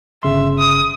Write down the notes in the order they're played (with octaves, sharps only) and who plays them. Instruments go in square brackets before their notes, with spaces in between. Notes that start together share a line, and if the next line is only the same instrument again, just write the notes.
[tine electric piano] G1 C#3 C6 [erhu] E5
[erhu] D#6